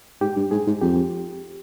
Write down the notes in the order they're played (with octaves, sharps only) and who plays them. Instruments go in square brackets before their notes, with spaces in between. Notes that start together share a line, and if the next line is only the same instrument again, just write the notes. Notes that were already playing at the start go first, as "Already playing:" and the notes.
[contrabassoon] G#2 [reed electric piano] G4
[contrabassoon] G2
[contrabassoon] G#2 [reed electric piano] G#4
[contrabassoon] G#2
[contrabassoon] F2 [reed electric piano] G4